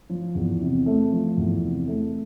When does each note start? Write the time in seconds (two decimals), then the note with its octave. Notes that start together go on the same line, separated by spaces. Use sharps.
0.10 F3
0.35 E2
0.61 C3
0.86 A3
1.12 F3
1.37 E2
1.63 C3
1.88 A3